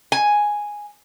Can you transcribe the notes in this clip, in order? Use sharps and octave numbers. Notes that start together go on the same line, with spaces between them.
G#5